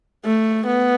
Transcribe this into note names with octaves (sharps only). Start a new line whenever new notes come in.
A3
B3